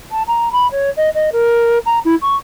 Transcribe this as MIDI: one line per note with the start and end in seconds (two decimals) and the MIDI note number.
0.11 0.22 81
0.27 0.51 82
0.52 0.69 83
0.71 0.90 73
0.96 1.09 75
1.14 1.30 75
1.32 1.78 70
1.85 1.99 82
2.05 2.15 64
2.21 2.35 85